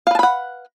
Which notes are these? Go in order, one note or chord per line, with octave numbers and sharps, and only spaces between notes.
B4 F5 F#5 A5 B5